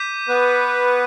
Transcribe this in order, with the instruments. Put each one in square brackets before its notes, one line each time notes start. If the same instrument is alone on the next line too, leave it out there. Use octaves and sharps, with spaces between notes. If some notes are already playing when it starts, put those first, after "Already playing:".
Already playing: [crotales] D6 G6 B6 D#7
[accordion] B3 B4